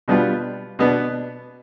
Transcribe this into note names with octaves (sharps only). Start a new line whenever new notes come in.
B2 G3 B3 D4 F4
B2 B3 D4